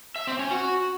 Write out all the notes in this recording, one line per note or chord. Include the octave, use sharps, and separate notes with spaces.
E5
C4
C#4
F#4